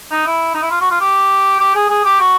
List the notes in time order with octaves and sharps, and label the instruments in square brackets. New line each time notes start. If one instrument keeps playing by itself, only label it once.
[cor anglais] D#4
E4
D#4
E4
F4
F#4
F4
G4
G4
G#4
G#4
G4
F#4